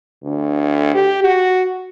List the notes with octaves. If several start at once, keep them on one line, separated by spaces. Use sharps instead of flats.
D2
G4
F#4